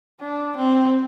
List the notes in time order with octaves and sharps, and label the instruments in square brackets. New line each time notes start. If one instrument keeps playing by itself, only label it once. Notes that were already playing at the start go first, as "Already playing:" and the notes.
[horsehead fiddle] D4
C4